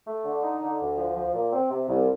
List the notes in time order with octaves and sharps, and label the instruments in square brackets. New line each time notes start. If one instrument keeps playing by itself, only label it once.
[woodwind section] A3
D3
D#4
D3
D2
F3
F3
A#2
C4
C3
C2